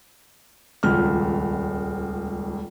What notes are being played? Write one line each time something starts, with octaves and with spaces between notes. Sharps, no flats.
D#1 G#1 C#2 F6